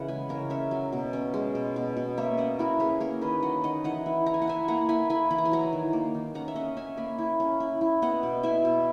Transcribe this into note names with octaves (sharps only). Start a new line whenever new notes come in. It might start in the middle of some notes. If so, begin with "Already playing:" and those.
Already playing: C#3 E3 D#5 F#5
G#3 G#5 B5
C#3 A#4 C#5
C#4 C#5 E5
F#3
B2
C#4
G#3
B2
B2
B2
A#3 C#5 E5
C#4 D#5 F#5
E4 F#4 A#4
C#4 G#4 B4
A#3 A#4 C#5
D#3 B4 D#5
F#3 D#5 F#5
D#3 D#5 F#5
E3 D#5 F#5
E4
E4 A#5
G#5
F#5
E4 E5 G#5
A#3 F#5 A#5
E4 G#5 B5
E4 G#5 B5
E3 B5
A#5
G#5
F#3 F#5 A#5
D#3
A#3
D#3
C#4 F#5 A#5
E5
C#4 D#5 F#5
C#4 E5 G#5
A#3 G#5 B5
E4
C#4
E4
E4
B3 D#5 F#5
B2
E4 E5 G#5
B2